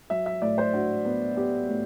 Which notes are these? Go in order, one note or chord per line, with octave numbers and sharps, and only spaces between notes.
F#3 E5
E5
A2 D5
C5
D4 F#4
B3
B3 G4
A2